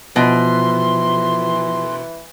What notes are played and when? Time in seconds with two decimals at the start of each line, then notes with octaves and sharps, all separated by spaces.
0.16 B2 E3 F3 C6